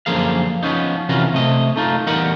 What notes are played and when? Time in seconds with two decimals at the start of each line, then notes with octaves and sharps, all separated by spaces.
0.06 F#2 D3 F3 A#3 G#4 F5
0.63 F3 B3 C#4 D#4
1.09 C3 E3 C#4 F4 F#4 A#4
1.33 C3 A3 D#5
1.76 A3 D#4 F4
2.06 E2 G3 D#4 A#4 D#5 F#5